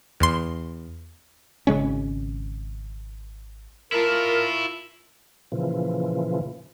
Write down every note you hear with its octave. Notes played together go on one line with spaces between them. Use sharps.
E2 C6
G#1 C#3 G#3 C#4
E4 F4 A#4 A5
A#2 C#3 E3 F3